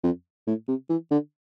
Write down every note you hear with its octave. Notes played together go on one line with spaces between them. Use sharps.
F2
A2
C3
E3
D3